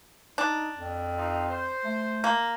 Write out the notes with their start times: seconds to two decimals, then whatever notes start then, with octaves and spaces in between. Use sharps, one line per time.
0.38 D4 D#4
0.78 F2
1.17 C4 D#4 F4
1.48 C5
1.85 A3
2.24 A#3